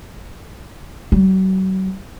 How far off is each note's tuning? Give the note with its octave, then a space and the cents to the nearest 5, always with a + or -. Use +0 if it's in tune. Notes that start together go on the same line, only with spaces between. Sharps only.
F#3 +40